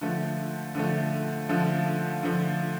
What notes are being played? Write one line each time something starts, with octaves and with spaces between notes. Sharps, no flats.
D3 F3 A3
D3 F3 A3
D3 F3 A3
D3 F3 A3